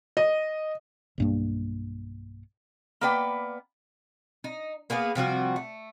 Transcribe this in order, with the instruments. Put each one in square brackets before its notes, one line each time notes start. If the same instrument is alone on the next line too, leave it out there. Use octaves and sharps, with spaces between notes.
[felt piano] D#5
[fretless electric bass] B1 G2 A#3
[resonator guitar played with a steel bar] A#3 B3 B4 D5 G5
[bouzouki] D#4
A#3 B3 G#4 B4
C3 F3 G3 F#4
A3